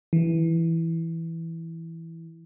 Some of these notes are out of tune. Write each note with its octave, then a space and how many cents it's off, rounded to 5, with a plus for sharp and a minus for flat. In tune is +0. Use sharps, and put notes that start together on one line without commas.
E3 +0